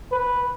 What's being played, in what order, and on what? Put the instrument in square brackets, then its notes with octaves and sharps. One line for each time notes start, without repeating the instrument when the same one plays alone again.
[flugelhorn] B4